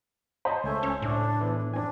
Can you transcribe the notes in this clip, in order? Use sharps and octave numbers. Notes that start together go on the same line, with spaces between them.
C5 C#5 D#5 A5 B5
C#2 A3 G#5
C#4
A2 D4
E3 B3 E4
F2 C4 D4 G#5